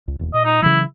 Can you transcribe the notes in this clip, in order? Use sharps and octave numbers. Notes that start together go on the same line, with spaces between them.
C#2
E1 D#2
A#2 D#5
D#4
C#3 E3 F#3 E4